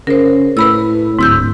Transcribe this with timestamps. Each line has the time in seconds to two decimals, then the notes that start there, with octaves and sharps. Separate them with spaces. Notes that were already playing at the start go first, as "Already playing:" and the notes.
0.07 C#3 A#4 C5
0.57 A2 B4 B5 E6
1.19 D1 G#2 E6 G6